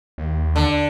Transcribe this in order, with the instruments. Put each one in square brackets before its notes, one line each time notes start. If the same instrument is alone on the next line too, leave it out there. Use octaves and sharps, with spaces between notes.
[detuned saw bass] D#2
[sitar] D3